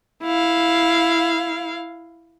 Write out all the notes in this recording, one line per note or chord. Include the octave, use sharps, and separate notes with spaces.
E4 F5